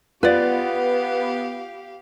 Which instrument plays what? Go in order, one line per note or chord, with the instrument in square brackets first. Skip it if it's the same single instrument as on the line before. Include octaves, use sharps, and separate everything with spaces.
[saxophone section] B3 [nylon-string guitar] F4 [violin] G4 F5 [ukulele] B4 D5